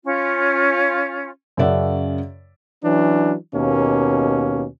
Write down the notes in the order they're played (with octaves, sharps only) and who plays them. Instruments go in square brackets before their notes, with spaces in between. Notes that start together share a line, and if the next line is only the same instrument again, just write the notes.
[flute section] C#4 F4
[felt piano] F#2 C#3 A#4 D5 E5 F#5
[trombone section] E3 F#3 C#4 D4
D#2 B2 A#3 C#4